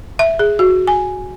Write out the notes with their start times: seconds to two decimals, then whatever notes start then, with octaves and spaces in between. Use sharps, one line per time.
0.19 E5
0.39 G#4
0.59 F#4
0.88 G#5